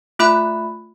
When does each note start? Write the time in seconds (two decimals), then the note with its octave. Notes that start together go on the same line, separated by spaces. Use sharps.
0.19 A3 F4 E5 B5 F#6